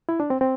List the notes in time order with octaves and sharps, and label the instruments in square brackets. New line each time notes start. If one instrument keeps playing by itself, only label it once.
[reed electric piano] E4
D4
C4
C4